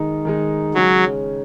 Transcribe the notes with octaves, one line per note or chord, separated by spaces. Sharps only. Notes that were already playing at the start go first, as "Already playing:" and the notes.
Already playing: D#3 G#3 D#4
D#3 G#3 D#4
C#3 F#3 G#3 C#4